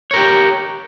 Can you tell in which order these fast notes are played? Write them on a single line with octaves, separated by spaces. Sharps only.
C#5 A#4 G4